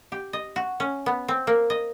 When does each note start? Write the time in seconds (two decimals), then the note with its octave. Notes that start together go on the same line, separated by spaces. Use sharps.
0.12 G4
0.33 D#5
0.56 F#4
0.80 C#4
1.06 B3
1.28 C4
1.47 A#3
1.70 D#5